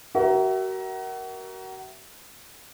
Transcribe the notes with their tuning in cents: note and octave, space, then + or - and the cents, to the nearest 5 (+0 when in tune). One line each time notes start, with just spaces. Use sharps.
F#4 +35 A#4 +10 E5 +0